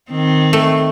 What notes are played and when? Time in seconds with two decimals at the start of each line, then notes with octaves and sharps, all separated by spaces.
0.11 D#3 C4
0.53 A3